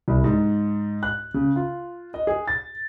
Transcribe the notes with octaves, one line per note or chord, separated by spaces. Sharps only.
C2
G#2
F#6
C#3
F4
D#5
G#4
A6